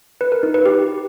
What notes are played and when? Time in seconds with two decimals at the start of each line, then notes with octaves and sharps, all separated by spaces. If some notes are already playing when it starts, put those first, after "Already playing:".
0.21 B4
0.32 A#4
0.43 D#4
0.54 B4
0.66 G4